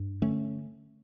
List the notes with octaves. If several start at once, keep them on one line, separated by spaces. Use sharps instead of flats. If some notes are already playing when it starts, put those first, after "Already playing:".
Already playing: G2
D3 A3 C#4